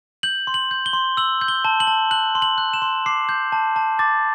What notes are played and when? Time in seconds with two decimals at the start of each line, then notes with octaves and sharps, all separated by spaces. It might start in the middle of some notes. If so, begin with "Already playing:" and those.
0.23 G6 F#7
0.47 C6
0.54 F#7
0.71 G6
0.86 G7
0.93 C6
1.17 E6 F#7
1.41 G6
1.48 G7
1.65 A5
1.80 F#7
1.87 A5
2.11 F#6 F#7
2.35 C6
2.42 F#7
2.58 F#6
2.73 E7
2.82 C6
3.06 D6 C7
3.29 G6
3.52 A5
3.76 A5
3.99 D6 A6